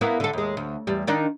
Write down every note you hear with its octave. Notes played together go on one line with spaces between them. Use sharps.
A#3 B3 E4
D3 A4
D#2 G#3
D2
E2 G3
D#3 D4 D#4